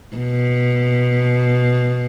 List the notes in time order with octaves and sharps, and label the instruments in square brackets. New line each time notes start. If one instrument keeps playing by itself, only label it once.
[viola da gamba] B2